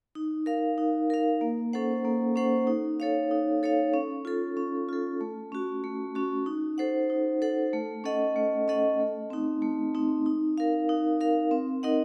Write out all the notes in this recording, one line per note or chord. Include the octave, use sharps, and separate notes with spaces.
D#4
A#4 F5
D#4
A#4 F5
A#3
C#4 A4 C5 F#5
A#3
C#4 A4 C5 F#5
D#4
A4 C#5 F5
D#4
A4 C#5 F5
C#4
F4 A4
C#4
F4 A4
A3
C#4 F#4
A3
C#4 F#4
D#4
A4 C5 F#5
D#4
A4 C5 F#5
A3
C#4 A4 D#5 F#5
A3
C#4 A4 D#5 F#5
A3
C4 D#4
A3
C4 D#4
D#4
A#4 F5
D#4
A#4 F5
C4
D#4 A#4 D#5 F#5